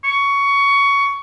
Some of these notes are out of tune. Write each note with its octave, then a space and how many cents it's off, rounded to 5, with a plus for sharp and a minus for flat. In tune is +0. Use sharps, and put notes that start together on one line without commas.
C#6 +15